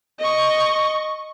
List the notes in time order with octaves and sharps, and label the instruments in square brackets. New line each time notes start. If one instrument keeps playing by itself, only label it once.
[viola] D#5 C#6